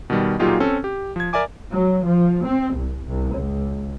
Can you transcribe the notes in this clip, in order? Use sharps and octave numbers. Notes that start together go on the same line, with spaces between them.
B2 D#3 G3
A#2 F#3 D#4 F4 G4 G#4
C4 C#4 A4
G4
F3 G#6
A#4 D5 E5 G#5 D6
F#3
F3
C4
C2
C2
C#2